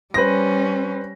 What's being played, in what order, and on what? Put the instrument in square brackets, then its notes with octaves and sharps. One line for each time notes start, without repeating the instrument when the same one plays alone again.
[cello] G3 C#4 [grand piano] B4 C5 A#6